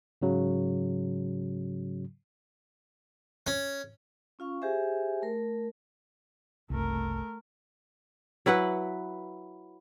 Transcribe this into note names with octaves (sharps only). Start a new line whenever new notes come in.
G#2 C#3 F#3
C#4
C#4 F4 F5 C#6
G4 G#4 C5 E5 G#5
A3 A#4
F#1 C2 A3 A#4
F#3 E4 B4 F#5